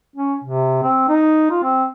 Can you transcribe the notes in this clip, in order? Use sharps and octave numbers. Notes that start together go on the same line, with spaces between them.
C#4
C3
C4
D#4
F4
C4